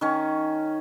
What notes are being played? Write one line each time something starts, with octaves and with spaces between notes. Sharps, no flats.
D#3 C#4